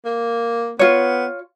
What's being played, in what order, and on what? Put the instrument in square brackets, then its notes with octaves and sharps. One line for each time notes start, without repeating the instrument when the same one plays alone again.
[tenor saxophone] A#3
[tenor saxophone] B3 [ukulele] F4 C#5